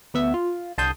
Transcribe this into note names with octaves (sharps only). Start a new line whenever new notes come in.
D2 B3 E5
F4
C2 D3 A5 C6 D#6 G6